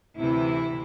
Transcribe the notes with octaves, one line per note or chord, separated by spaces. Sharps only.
D2 C3 E3 E4